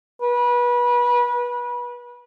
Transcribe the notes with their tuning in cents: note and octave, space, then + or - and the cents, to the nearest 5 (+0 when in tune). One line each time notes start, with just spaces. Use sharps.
B4 -25